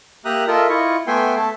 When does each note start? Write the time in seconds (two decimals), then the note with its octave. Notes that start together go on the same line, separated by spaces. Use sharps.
0.25 A#3 G4 E5 A#5 D#6 F#6
0.47 F4 A4 A#4 D#5 E5
0.69 E4 F4 D#5 C#6
1.07 A3 B3 E5 G5 G#5 C6
1.36 A3 A4 E5 A5